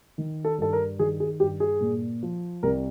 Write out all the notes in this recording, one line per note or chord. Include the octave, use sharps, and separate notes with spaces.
D#3
A4
G2 A4
A#4
D#3 G#4
G#4
G2 G4
G#4
A#2
F3
C2 A#4